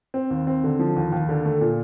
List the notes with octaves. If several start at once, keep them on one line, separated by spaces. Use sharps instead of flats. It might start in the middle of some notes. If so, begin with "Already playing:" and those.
C4
D#2
C4
D3
F3
D#2
D#2
D3
A3
A#2